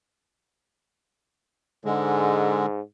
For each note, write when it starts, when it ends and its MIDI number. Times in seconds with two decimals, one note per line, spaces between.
1.85 2.81 44
1.85 2.66 50
1.85 2.66 56